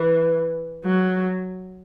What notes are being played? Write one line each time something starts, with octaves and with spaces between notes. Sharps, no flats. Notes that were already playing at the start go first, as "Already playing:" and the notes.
Already playing: E3
F#3